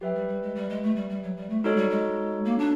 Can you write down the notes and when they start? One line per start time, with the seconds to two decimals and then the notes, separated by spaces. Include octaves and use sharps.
0.01 F#3 G4 B4 E5 G5
0.14 G3
0.29 G3
0.42 G#3
0.55 G3
0.70 G#3
0.83 A3
0.96 G3
1.10 G3
1.23 F#3
1.37 G3
1.50 A3
1.64 G#3 D#4 F#4 A4 C#5
1.77 G3
1.90 G#3
2.45 A#3
2.58 D4